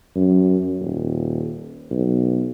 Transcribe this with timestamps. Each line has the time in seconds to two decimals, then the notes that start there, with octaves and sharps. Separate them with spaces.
0.16 F#2
0.80 D#1
1.91 B1